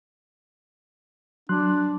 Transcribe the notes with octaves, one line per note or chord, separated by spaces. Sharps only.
F#3 D4 C6 F#6